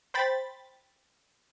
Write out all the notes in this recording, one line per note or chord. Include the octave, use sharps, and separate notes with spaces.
C5 G5 B5 A6